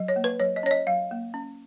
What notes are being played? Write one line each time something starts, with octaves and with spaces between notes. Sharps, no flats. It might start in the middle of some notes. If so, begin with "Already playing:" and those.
Already playing: F#3
C#5
A#3
B4
F#3 C#5
D#5
C#4 C#5
D#5
F#3 F5
A#3
C#4